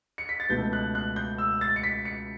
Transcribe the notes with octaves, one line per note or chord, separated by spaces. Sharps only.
C#7
B6
A6
C#2 B2 A3 G6
F#6
F#6
G6
E6
A6
C#7
B6
C#7